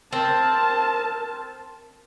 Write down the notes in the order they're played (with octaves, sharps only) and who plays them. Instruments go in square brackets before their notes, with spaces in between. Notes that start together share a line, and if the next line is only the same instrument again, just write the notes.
[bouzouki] C4 [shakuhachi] A#4 [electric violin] A5